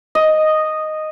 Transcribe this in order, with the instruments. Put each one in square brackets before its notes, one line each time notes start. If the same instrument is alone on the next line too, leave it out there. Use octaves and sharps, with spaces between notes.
[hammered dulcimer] D#5